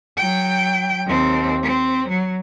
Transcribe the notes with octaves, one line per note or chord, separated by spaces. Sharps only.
F#3 G5
D#2 C4
C4
F#3